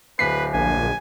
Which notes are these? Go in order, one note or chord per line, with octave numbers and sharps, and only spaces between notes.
D1 B4 B6 C7
A#1 G#5